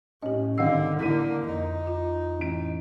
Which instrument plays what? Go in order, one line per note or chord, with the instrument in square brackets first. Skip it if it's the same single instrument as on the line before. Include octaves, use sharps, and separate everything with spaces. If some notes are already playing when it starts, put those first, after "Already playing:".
[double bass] A2 [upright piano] C#4 [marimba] G4 D#5
[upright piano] G#1 D#5 C7 [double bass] D3 [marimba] F5 F#5 E6
[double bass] D3 A#3 [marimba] E4 [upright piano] B6 D#7
[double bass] F2 D#4
[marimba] F4
[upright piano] A1 D7